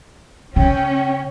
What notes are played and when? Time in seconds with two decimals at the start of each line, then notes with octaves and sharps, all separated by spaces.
0.56 C#3 C#4 G5